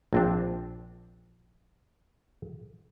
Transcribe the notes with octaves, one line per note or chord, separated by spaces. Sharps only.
A#1 C4 D4